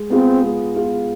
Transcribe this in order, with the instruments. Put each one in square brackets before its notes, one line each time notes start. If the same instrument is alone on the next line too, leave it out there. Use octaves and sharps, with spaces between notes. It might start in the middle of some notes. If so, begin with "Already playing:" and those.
Already playing: [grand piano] G#3
[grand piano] B3 F4 G#4 [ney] C4
[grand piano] G#3
B3 F4 G#4